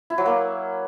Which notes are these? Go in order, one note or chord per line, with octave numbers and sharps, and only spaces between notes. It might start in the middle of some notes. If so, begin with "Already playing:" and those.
E4
F#3
A#3